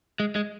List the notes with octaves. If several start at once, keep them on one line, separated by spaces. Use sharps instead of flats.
G#3
G#3